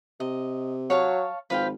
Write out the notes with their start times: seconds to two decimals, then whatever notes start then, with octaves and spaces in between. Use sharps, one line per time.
0.20 C3 D#5
0.90 F#3 C#5 F5 A5
1.50 G#1 F3 B4 F5 G5